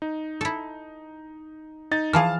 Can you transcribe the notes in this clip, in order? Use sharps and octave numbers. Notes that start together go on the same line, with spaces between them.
D#4
E4 A4
D#4 A6
E3 F3 G#4 F5 A5 F6